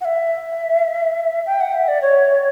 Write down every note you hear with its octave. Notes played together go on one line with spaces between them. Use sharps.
F#5
E5
G5
F#5
E5
D5
C#5